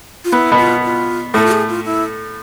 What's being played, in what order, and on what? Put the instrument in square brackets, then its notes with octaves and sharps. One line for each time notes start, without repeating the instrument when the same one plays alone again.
[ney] F4
[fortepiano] B3 [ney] E4
[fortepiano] B2 B3
[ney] F4
F4
[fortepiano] A2 A3 [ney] A4
[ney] F4
G#4
F4
E4